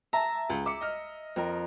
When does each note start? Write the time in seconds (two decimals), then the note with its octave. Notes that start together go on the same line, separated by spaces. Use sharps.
0.13 E5 A5 A#5
0.49 C#2
0.66 E5 D6 C#7
0.81 D#5 F6
1.36 F2 A#4